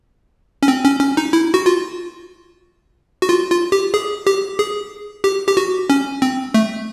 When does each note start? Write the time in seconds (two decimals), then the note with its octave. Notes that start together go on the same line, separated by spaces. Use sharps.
0.63 C#4
0.68 C4
0.84 C#4
1.00 C#4
1.17 D#4
1.33 E4
1.54 F#4
1.66 F4
3.22 F#4
3.29 F4
3.51 F4
3.72 G4
3.94 G#4
4.27 G4
4.59 G#4
5.24 G4
5.48 G4
5.57 F#4
5.90 C#4
6.22 C4
6.54 A3